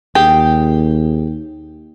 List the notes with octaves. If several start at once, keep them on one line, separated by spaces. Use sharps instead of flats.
D#2 G4 G#4 G5